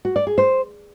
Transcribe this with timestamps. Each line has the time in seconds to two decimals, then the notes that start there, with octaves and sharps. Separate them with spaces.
0.05 F#4
0.16 D5
0.27 G#4
0.38 C5